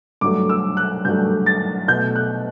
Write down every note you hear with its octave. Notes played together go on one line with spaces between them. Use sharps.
G2 F#3 A3 D6
E6
F#6
G2 F#3 A3 G6
A6
B2 A3 G6
F#6